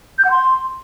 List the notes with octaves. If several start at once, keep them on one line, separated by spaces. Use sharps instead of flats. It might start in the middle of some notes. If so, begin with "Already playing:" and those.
G6
F#5
C6